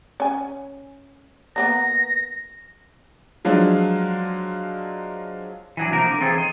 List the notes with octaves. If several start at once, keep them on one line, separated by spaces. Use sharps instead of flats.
C#4 G#5
A#3 B3 D#4 A#6
F3 F#3 G#3 D4 F4
E3 F#3 D4
C3 F3 A#3 D#4 A#4
D3
E3 C4 D#4 F4 G#4 A4
C#5 D#5